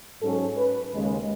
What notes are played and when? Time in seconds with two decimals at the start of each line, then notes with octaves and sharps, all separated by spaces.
0.22 G#2 F#3 C#4 A4
0.58 B4
0.92 D#2 C#3 G#3